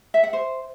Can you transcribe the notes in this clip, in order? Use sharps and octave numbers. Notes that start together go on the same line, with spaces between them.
E5
F#5
C5